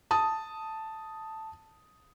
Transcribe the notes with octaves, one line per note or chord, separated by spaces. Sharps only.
A5 D#6